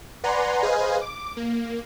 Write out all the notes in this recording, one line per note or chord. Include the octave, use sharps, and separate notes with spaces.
B4 D5 F#5 G#5 A#5 C6
G#4 B4 C5 D#5 F5 G#5
D6
A#3